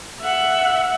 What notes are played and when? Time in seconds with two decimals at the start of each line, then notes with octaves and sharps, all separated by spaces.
0.21 E5 F#5